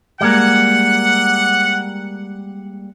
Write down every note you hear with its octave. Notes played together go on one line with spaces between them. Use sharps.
G3 G#3 A#3 F#5